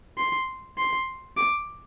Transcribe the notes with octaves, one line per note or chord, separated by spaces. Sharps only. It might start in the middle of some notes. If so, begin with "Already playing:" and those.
C6
C6
D6